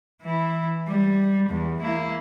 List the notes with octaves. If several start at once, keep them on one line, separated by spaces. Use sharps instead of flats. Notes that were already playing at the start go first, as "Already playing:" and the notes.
E3 E4
G3
E2
A#3 E4